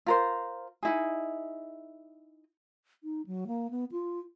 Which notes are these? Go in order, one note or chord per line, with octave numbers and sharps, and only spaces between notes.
F4 A#4 C5
D#4 E4 G#4
D#4
F#3
A#3
B3
F4